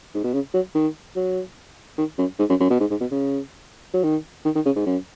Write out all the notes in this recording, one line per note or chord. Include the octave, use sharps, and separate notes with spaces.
G#2
B2
C#3
F#3
D#3
F#3
D#3
F#2
G#2
F#2
F#2
B2
G#2
G#2
B2
C#3
F#3
D#3
D#3
D#3
C#3
G#2
F#2